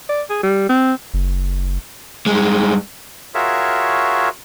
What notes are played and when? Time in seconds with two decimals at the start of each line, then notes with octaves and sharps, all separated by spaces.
0.09 D5
0.30 G#4
0.43 G3
0.69 C4
1.14 F#1
2.26 G2 G#3
3.35 F4 F#4 G#4 A#4 C#5 E5